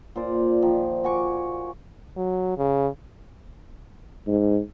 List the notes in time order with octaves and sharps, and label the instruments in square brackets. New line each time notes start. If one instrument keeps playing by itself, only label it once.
[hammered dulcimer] A#2 C5 D5
F5
D#3 F3
F#4 G#5 C#6 D6
[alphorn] F#3
C#3
[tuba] G#2